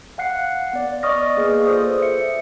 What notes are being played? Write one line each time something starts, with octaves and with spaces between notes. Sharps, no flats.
F5 F#5 F#6 C7 C#7
B3 D5
D5 D#5 C#6 D#6 F6 A#6
A#3 G#4 B4
F4 A4 C5 D5 D#6
E5 C#7